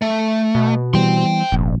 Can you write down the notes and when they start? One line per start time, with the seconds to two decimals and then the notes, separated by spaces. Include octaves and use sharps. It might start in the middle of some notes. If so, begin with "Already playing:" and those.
0.02 A3
0.55 B2
0.94 E3 G3 B3 G5 C6
1.52 F1 A#1